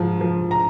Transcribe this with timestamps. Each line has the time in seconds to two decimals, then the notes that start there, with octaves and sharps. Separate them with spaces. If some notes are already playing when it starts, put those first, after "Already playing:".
Already playing: G#2 F3
0.21 F3
0.51 A#5